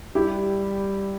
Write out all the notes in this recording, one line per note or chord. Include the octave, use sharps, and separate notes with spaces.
G3 E4 G4